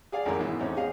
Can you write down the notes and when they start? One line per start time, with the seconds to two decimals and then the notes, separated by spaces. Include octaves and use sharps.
0.12 G#4 D5 F5 G#5
0.25 A1 F#2 G#3 E4 A#4
0.39 G#2 B2 E3
0.60 E2 A2 C4 C#4 D#4
0.77 G#4 D#5 F5